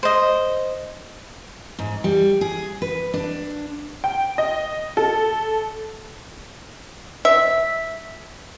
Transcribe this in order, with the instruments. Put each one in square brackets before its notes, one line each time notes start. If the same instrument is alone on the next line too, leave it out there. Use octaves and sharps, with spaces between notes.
[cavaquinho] C5 D#5
[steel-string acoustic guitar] G#2
G3
G#4
B4
D4
[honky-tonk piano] G5
D#5
A4
[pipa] E5